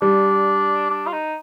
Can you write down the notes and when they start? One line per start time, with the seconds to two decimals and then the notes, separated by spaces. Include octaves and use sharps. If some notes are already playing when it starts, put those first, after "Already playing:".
0.02 G3 D4
0.90 D4
1.07 F4
1.13 D#4